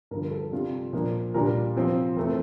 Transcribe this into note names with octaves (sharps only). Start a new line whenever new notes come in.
G2 D3 F3 A#4
A4
C3 G3 D4 F4
A#2 F3 A#3 D4
A#2 G3 D4 A#4
C3 F3 C4 F4
F2 E3 A3 C4 A#4